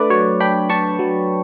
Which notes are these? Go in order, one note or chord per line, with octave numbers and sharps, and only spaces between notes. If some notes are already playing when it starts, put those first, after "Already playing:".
Already playing: A3 D4 B4 D5
F#3 C#5
D4 G5 B5
D4 A5 C#6
F#3